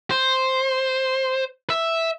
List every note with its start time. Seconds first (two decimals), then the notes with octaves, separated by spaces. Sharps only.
0.11 C5
1.70 E5